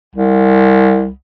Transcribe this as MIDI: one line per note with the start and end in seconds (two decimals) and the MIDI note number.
0.15 1.09 36